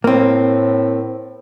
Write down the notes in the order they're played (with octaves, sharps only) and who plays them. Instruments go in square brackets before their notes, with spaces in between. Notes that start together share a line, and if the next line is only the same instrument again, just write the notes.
[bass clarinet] A2 [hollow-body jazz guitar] A#3 C4